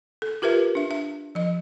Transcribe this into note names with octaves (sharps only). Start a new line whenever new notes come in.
A4
F4 G4 A#4 B4 E5
D4 E5
E5
F3 D#5